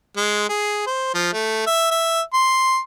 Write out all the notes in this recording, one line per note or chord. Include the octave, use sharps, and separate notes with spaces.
G#3
G#4
C5
F3
A3
E5
E5
C6